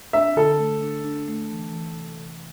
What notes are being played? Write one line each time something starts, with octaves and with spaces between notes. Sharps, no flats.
D4 E5
D3 A4
A3
D4
D4
A3
E3
E3
C3
E3